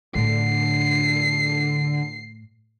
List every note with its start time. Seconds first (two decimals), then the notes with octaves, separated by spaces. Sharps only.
0.15 A2 D3 C7